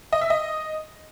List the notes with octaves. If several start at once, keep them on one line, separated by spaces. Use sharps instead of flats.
D#5
E5
D#5